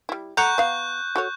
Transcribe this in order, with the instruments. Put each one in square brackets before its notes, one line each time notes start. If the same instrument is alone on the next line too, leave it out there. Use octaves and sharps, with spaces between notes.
[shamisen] G3 E4
[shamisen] A3 [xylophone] F#5 A#5 C#7 [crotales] C#6 F#6 G6
[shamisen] B3 F5
F#4 A4 C#5